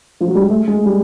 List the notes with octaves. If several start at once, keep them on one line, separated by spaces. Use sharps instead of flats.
F3
F#3
G3
G#3
A3
G#3
G3